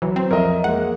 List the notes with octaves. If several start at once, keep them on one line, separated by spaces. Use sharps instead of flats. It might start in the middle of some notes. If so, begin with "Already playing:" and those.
E3 F#3
C4
F2 A#4 D#5 E5
G#3 A#3 F#5